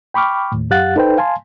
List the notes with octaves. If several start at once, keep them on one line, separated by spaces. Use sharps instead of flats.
G5 B5 C#6 D6 F6
D#2 A2
F#2 G4 F5 F#5 F#6 A6
D#4 A4 B4 C5 G5
F5 G#5 A5 C6